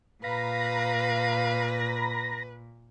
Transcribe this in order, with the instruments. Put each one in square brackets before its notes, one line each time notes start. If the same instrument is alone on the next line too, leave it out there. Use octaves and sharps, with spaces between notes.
[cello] A#2 [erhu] B4 [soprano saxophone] F5 [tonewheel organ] A#5 B5 A#6